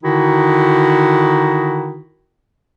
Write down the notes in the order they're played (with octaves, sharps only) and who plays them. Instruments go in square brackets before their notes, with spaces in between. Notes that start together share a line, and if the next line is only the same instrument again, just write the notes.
[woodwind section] D3 D#3 D#4 E4 F#4